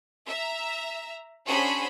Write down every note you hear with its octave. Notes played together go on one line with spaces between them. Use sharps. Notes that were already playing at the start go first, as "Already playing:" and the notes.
E5 A#5
C#4 D4 F#4 G#4 C5 B5